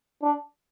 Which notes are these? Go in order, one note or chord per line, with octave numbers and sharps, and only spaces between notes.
D4